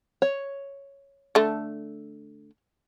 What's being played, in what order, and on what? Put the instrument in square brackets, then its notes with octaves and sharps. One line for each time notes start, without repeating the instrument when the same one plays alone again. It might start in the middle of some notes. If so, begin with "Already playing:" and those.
[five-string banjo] C#5
[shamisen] D3 A3